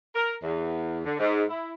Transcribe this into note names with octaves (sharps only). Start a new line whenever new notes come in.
A#4
E2
D3
G#2
E4